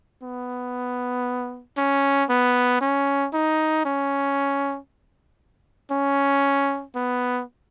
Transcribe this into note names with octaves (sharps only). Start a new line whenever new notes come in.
B3
C#4
B3
C#4
D#4
C#4
C#4
B3